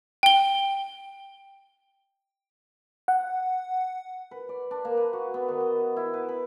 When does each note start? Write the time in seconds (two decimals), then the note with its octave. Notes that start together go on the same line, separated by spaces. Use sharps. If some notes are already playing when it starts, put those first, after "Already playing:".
0.23 G5 G7
3.08 F#5
4.31 B4
4.49 D5
4.71 D4
4.85 A#3
4.97 B4
5.13 F#4
5.34 B3
5.48 D#3
5.60 D#5
5.96 E4
6.14 B4
6.29 B5